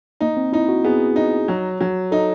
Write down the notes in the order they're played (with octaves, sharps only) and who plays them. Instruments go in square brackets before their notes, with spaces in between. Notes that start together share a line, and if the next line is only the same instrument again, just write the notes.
[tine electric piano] A#3 [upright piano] D#4
[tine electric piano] C4
[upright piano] D#4 [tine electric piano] E4
[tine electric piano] F#4
[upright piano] B3 [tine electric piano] G#4
[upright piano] D#4
F#3
F#3
[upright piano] D#4 [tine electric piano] A4